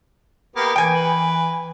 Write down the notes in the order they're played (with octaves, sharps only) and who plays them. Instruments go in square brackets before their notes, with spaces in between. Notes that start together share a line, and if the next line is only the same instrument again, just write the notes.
[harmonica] A#3 B3 G4
[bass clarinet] E3 [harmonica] A#3 [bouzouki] G5 G#5
[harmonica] B4